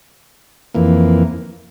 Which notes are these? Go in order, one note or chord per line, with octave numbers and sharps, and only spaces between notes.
F2 E3 A#3